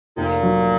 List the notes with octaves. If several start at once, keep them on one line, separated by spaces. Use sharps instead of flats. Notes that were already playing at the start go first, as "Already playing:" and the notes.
F1 A#2
F#3